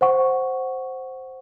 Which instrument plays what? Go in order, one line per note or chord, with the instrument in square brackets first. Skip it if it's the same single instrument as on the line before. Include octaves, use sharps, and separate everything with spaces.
[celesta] C5 F#5 C#6